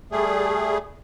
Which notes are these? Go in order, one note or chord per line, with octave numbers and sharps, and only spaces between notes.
G3 A3 G#4